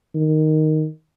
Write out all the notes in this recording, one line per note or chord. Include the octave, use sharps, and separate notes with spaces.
D#3